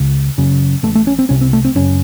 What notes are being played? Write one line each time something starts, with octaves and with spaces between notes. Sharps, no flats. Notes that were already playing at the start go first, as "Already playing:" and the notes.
Already playing: C#2 C#3
F#1 F#2 C#3
A1 A2 A3
A3
C#4
C4
C2 C3 C#4
C4
A3
C4
F#1 F#2 C#3 C#4